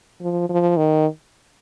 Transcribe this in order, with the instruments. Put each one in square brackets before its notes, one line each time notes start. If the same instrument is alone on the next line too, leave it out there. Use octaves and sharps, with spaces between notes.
[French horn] F3
F3
D#3